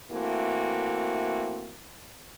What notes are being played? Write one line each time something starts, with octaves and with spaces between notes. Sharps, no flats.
E3 A3 A#3 C4 F#4